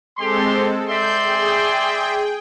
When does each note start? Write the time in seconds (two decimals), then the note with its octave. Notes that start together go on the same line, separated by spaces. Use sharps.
0.17 G#3 C4 G4 A4 C6
0.88 D5 E5 C6 G6
1.24 G#4 G5